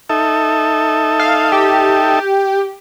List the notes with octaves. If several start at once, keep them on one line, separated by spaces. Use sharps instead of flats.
D#4 A4 E5
F5
G4